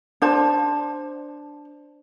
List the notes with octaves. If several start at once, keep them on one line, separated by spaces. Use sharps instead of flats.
D4 C5 A5